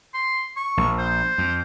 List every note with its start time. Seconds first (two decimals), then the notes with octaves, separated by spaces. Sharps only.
0.14 C6
0.56 C#6
0.77 A#1
0.98 C5
1.38 F2